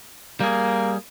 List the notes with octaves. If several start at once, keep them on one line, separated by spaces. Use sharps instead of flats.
G3 A#3 G#4